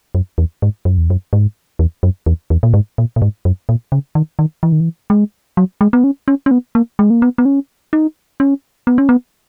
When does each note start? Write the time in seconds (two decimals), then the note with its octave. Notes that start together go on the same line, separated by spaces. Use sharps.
0.15 F#2
0.38 E2
0.62 G#2
0.85 F#2
0.98 E2
1.10 F#2
1.33 G#2
1.79 E2
2.03 F#2
2.26 E2
2.50 E2
2.63 A#2
2.74 G#2
2.98 A#2
3.16 A#2
3.22 G#2
3.45 F#2
3.69 A#2
3.92 C#3
4.15 D#3
4.39 D#3
4.63 E3
4.72 D#3
4.80 E3
5.10 G#3
5.57 F#3
5.81 G#3
5.93 B3
6.04 C#4
6.28 C#4
6.46 C#4
6.51 B3
6.75 A#3
6.99 G#3
7.10 A#3
7.22 B3
7.38 B3
7.45 C#4
7.93 D#4
8.40 C#4
8.87 B3
8.98 C#4
9.09 B3